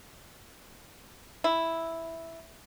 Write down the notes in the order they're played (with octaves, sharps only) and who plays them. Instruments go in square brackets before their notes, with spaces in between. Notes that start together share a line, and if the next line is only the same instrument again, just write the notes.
[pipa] E4